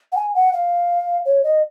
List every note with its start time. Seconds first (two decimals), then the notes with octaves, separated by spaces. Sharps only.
0.12 F#5
0.16 G#5
0.35 F#5
0.53 F5
1.25 C#5
1.44 D#5